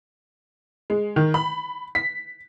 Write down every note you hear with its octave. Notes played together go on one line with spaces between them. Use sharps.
G#3
D#3
B5
B6